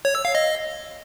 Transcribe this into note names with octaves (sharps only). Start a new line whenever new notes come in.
C#5
E6
F5
D#5